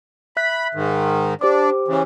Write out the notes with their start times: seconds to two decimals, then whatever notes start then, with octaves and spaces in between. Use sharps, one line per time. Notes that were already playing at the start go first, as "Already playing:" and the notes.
0.37 E5 B5 F#6 B6
0.74 G#2 D#3
1.41 D4 G4 C5 D6
1.88 C#3 E3